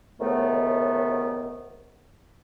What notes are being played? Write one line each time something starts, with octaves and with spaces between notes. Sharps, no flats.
C#2 A2 C3 D#3 A3 B3